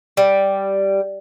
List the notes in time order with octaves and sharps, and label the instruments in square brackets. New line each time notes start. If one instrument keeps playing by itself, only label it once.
[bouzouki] G3